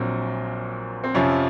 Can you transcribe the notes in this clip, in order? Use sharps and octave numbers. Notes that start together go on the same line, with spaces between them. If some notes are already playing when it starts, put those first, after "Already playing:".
Already playing: A#1 A#2 F#3 C4
C4
F2 C3 F3 C#4